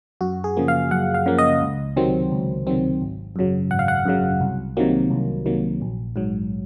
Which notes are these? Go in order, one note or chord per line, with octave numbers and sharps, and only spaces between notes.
F#2 F#4
G#4
C#3 F3 A#3
F5
F#2 F#5
F5
C#3 F3 A#3
D#5
C#2
C3 D#3 F#3 C4
C#2
C3 D#3 F#3 C4
G#1
F#2 C#3 F#3
G#1 F#5
F5
F#5
F#2 C#3 F#3
C2
C3 D#3 F#3 A#3
C2
C3 D#3 F#3 A#3
A#1
G#2 F#3